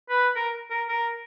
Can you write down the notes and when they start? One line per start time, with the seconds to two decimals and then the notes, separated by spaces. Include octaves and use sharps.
0.10 B4
0.36 A#4
0.70 A#4
0.89 A#4